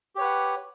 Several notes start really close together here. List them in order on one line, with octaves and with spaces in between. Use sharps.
G4 C#5 B4 F#5